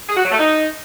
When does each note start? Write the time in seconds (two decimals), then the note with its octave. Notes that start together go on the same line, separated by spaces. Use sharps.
0.09 G#4
0.16 F#4
0.24 F#3
0.32 A3
0.39 D#4